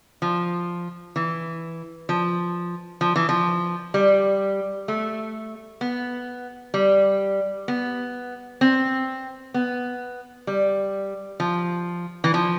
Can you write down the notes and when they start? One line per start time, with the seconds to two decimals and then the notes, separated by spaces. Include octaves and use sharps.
0.22 F3
1.16 E3
2.09 F3
3.01 F3
3.16 E3
3.29 F3
3.94 G3
4.88 A3
5.81 B3
6.74 G3
7.68 B3
8.61 C4
9.54 B3
10.47 G3
11.40 F3
12.24 E3
12.34 F3